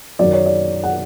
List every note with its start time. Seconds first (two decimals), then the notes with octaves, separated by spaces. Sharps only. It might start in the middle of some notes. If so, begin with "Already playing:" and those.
0.19 F#2 D#3 F#3 D5
0.33 C#5
0.46 D5
0.83 F#5